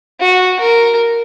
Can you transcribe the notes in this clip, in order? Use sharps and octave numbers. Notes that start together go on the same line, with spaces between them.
F#4
A#4